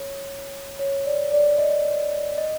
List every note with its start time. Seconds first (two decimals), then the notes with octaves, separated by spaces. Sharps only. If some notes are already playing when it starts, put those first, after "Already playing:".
Already playing: C#5
0.79 C#5
1.05 D5
1.32 D5
1.58 D#5
2.38 D#5